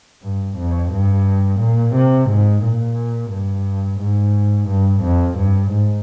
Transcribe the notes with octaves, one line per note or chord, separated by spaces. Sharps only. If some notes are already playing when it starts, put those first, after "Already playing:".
G2
F2
G2
A#2
C3
G#2
A#2
G2
G#2
G2
F2
G2
G#2